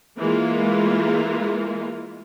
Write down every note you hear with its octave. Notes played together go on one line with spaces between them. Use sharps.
E3 G#3 A#3 F4